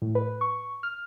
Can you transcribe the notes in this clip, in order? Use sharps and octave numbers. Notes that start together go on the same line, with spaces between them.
A2
B4
C#6
F6